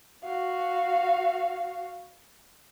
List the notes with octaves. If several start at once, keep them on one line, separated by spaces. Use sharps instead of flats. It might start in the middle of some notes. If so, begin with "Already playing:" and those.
F#4 F5